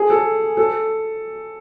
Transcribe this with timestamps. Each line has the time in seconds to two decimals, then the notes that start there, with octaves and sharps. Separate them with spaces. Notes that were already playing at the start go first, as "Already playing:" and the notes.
Already playing: G#4
0.10 A4
0.57 A4